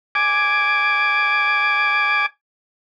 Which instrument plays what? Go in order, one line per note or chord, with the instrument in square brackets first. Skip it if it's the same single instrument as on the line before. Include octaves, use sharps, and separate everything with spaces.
[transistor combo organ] G#5 D6